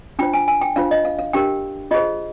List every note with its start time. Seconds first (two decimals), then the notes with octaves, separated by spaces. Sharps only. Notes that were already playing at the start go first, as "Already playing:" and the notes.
0.19 D4 F4 C5 G5
0.33 G#5
0.48 G#5
0.61 G5
0.76 D4 F4 C5 F5
0.91 D#5
1.05 F5
1.19 F5
1.33 D4 G4 A#4 G5
1.91 F4 G#4 C5 D#5